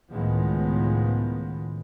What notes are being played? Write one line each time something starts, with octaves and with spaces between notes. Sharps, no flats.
C#2 A2 D#3 F3 G#3 B3